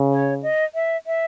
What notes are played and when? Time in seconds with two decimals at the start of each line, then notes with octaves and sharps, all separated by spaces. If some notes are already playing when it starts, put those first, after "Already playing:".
Already playing: C#3
0.12 C#5
0.43 D#5
0.75 E5
1.07 E5